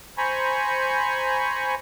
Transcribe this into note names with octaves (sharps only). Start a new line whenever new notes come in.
C5 G#5 A#5 B5 C#6